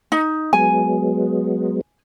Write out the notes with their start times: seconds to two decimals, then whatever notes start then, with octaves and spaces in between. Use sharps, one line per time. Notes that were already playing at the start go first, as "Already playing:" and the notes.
0.12 D#4
0.53 F#3 G#3 B3 G#5